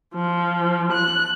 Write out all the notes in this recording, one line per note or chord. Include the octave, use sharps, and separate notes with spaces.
F3
F#6